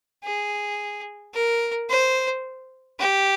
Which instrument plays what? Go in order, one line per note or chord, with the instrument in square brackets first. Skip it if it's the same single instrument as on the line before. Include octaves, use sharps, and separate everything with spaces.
[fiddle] G#4
A#4
C5
G4